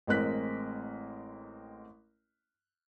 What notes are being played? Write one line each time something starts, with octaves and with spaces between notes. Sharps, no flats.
A1 G#3 C4 A#4 F#6 B6